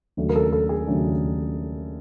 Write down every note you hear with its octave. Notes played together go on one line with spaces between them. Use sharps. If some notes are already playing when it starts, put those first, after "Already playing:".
D#2 C#3 F#3 A3 D4
A#4
A4
A4
G#4
D#2 C#3 F#3 A3 D4